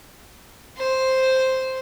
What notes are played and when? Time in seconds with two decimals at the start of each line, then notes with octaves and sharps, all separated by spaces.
0.78 C5